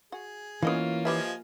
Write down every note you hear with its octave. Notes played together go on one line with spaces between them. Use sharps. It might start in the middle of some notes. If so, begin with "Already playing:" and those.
F#4 G#4
E3 A#3 B3 C#4 F4 D#5 F5
F3 G4 B4 D#5 E5 G#5